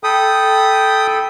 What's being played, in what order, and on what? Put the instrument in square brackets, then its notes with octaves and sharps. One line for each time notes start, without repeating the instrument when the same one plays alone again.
[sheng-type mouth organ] A4 G5 B5 [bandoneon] D#6